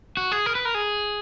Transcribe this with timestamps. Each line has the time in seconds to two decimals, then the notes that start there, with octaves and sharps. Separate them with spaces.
0.17 F#4
0.32 G#4
0.46 A#4
0.55 B4
0.65 A#4
0.75 G#4